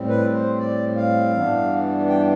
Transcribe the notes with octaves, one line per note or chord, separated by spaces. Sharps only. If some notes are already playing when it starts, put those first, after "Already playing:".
Already playing: A2 G3 C4
B4
C5
D5
F5
G2 E3 G3 B3 D4
G5